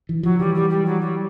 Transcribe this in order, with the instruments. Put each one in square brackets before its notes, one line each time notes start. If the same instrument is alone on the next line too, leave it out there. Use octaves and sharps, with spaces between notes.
[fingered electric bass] E3
[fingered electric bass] F3 [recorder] F#3
[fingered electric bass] E3 [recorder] G3
[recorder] G3
G3
F#3
G3